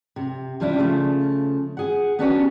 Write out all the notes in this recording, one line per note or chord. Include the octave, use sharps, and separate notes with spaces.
C3
C3 F3 G3 C#4 D4 E4
C#3 F3 A3
G#4 F#5
B3 C#4 D4 F#4 G4 C#5